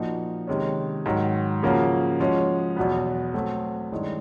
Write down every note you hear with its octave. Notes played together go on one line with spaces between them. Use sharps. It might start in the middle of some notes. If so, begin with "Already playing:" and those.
Already playing: A#2 F3 A#3 D#4 F#4
C3 D#3 G#3 C#4
G#2 D#3 F#3
C#3 F3 A#3 C#4 F#4
F3 G#3 C#4 F#4
E2 B2 F#3 B3
F#3 A3 C4
G2 D#3 G#3 C#4 E4